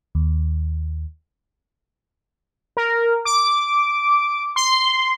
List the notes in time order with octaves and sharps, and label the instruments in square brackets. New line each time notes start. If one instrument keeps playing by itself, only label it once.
[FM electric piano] D#2
[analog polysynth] A#4
D6
C6